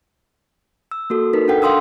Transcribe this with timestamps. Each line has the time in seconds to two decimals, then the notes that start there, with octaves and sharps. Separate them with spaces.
0.91 E6
1.10 A#3 F#4 A4
1.33 D#4 A#4 B4 B6
1.48 D4 A4 F#5 G5
1.62 F5 G5 C6 D#6 E6